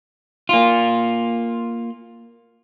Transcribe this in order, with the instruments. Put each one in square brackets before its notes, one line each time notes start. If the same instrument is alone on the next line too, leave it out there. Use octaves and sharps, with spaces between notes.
[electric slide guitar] A#3 F4